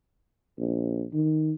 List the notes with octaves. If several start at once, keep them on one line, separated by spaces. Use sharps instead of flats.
A#1
D#3